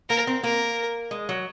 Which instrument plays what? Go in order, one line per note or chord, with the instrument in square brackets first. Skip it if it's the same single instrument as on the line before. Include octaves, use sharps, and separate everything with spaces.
[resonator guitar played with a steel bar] A#3 [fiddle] A#4
[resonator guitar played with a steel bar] C4
[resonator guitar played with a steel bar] A#3 [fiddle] A#4
[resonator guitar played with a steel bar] G#3
F#3